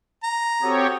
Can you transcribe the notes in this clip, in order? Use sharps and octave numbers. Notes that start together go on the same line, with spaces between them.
A#5
C4 F#4 G4 A4 C#5 D#6